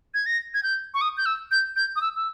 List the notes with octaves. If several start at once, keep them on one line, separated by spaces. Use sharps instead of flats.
G#6
A#6
G#6
G6
C#6
D#6
G6
E6
G6
G6
D#6
E6
E6